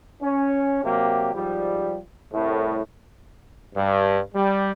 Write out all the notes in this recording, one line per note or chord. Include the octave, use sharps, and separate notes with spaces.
C#4
C3 F#3 A#3 G4
G#2 F3 G3
C2 A2
G2
G3